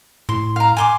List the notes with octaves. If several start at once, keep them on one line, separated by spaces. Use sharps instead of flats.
A2 C6
F5 A#5
G#5 C6 D6